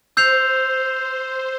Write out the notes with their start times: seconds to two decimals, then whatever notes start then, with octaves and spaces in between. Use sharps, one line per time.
0.17 C5 E6 G6 C7 F7